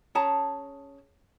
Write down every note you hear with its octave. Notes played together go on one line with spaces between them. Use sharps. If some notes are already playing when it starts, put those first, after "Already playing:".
C#4 G#4 A5 A#5